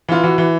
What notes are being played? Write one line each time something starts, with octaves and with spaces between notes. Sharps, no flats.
E3 F4
E3 F#4
E3